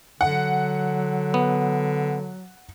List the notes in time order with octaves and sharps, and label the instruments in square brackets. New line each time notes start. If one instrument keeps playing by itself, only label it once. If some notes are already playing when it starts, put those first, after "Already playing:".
[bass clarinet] D3 [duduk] F#3 [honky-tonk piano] F#5
[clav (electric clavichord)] B3